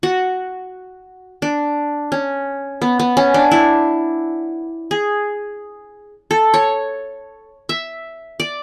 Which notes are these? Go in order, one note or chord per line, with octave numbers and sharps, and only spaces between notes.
F#4
D4
C#4
B3
B3
C#4
D4
E4
G#4
A4
C#5
E5
D5